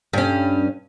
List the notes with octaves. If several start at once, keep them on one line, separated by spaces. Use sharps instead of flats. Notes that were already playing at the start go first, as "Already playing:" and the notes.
G2 C#4